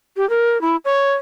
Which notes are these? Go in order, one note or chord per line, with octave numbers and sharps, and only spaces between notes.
G4
A#4
E4
C#5